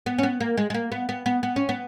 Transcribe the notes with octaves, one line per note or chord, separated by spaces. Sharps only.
B3
C#4
B3
A#3
G#3
G#3
A#3
B3
B3
B3
B3
C#4
B3